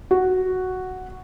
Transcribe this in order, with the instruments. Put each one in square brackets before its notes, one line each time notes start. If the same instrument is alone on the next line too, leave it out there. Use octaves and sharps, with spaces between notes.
[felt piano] F#4